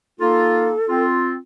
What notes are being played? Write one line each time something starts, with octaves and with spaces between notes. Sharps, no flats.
A#3 D#4 F4 A4
C4 F4